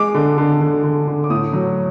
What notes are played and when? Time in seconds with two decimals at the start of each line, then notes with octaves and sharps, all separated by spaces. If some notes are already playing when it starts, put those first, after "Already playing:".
Already playing: G#3 D6
0.14 D3
0.38 D3
0.61 D3
0.84 D3
1.08 D3
1.24 D6
1.30 A2 D#6
1.53 F#3